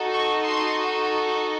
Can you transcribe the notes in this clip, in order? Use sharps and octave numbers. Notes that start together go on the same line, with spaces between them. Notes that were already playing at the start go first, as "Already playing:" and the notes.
Already playing: D#4 F#4 A4
C#6
C6